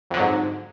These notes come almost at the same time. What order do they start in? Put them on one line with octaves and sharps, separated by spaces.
F2 D3 F#3 G#2